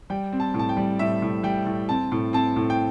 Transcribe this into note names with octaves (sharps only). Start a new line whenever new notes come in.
G3 G5
C4
A5
A2
A5
G5
G3
A2 E5
A2
G3 G5
A2
C4 A5
A2
C4 A5
A2
G5